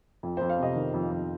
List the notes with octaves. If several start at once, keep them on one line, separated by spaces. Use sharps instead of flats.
F2
C5
F2
F5
C3 D#5
D#3
F2
F2